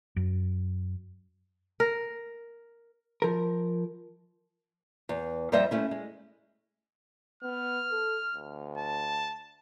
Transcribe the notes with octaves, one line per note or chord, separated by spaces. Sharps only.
F#2
A#4
F3 A#4
E2
F2 G3 C4 C5 D#5 E5
A3 C#4 E4
G#3
B3 F6
A4
D2
A5